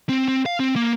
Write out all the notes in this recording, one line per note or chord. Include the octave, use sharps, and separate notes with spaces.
C4
C4
F5
C4
A#3